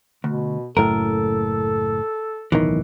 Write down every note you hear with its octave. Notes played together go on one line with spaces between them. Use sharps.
D2 B2
F#1 A2 A4 A#4
D1 B1 D#3 E3